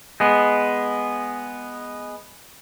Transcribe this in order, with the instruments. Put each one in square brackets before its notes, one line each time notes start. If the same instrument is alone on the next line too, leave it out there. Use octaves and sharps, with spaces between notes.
[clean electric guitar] G#3 B3